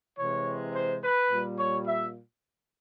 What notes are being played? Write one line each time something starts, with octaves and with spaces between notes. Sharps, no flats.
C3 E3 G#3 C#5
C5
B4
A#2 G3
C#5
E5